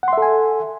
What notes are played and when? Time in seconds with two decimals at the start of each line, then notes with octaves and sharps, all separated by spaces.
0.03 F#5
0.08 C6
0.13 E5
0.18 A4
0.22 G#5